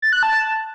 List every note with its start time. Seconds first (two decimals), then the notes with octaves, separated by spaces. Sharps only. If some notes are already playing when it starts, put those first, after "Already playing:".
0.02 A6
0.13 F#6
0.23 A5